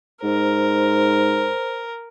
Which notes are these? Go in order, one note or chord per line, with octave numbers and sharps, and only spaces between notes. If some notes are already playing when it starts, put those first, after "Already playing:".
G#2 A#4 C5